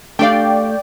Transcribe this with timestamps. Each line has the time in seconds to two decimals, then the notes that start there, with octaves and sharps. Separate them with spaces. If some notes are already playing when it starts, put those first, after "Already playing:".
0.19 A3 D4 G4 D5 F5 G5